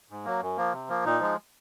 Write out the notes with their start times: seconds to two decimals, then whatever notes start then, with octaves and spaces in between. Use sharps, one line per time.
0.10 G#2
0.25 F#3 A#3
0.42 F#2
0.57 F3 A#3
0.73 C3
0.89 F3 A#3
1.05 A#2 D#4
1.20 F3 G#3